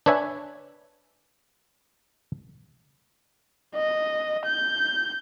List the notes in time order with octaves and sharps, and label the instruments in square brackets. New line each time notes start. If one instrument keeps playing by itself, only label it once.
[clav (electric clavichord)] D4 B4 C#5 E5 G#5
[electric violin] D#5
G6